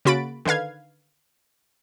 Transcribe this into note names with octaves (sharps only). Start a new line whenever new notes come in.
C#3 A#3 F#4 B5 A6 D7
D3 D#3 B4 F5 G#6